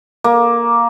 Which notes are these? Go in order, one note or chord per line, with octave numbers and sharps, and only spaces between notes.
A#3